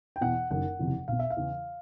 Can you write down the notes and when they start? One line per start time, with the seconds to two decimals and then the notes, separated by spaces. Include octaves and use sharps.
0.16 G5
0.21 E2 B2 F#5
0.50 F#1 F#2 D#3 F#5
0.79 F#1 E2 C3 F3
1.08 B1 B2 F5
1.19 E5
1.30 F5
1.37 E2 C#3 E3